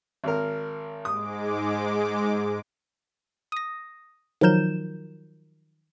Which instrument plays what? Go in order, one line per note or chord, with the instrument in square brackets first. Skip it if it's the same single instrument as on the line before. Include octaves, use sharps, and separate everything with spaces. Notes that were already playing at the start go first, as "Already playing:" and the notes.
[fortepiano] G#1 A#4
[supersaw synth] G#2 G#3 D6 [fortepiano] D#6
[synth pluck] D#6 A#6
D#3 F3 F#3 A#4 G6 E7